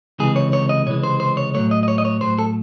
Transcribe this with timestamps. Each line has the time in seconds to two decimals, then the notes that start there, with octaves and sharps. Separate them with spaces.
0.19 C#2 C3 E3 G#3 G#4
0.36 C#5
0.53 C#5
0.69 D#5
0.86 C#2 C3 E3 G#3 C#5
1.04 C5
1.20 C5
1.37 C#5
1.54 A2 F#3 A3 C#5
1.71 D#5
1.83 D#5
1.88 C#5
1.98 D#5
2.05 C#5
2.21 A2 F#3 A3 C5
2.39 A4